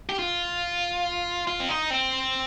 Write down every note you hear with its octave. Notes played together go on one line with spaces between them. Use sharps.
G4
F4
F4
C4
D#4
C4